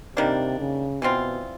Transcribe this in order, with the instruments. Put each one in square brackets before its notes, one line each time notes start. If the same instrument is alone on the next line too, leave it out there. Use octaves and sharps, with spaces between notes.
[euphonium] C3 [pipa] D#3 G3 A#3 D4
[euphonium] C#3
[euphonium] B2 [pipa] E3 G3 C4 F4